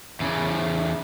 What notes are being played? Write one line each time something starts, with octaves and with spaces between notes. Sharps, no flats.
E2 C#3